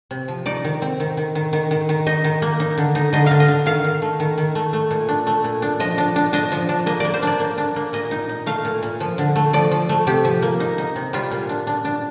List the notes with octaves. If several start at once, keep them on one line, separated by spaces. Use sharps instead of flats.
C3
F3
D#4 D5
D#3
C4
D#3
D#3
D#3
D#3
D#3
D#3
D#4 D#5
D#3
A#3
D#4
D3
D#4
D3 D#5
D3 F5
D#5
D3
D#3 F5
D#3
A3
D#3
D#3
A3
A3
A#2
D4
A3
A#2
D4
F3 D#5
D4
D4
D4 D#5
F3
D4
A#3 D#5
A#3 D5
C5
D4 D5
A#3
D4
A#3
A#2 D#5
D#4
D#4
A3 F5
A#2
A#2
F3
D3
A3
F3 D5
F3
A3
C3 G4
F3
A#3
D#4
D#4
C3
G3 F4
A#2
D4
D4
D4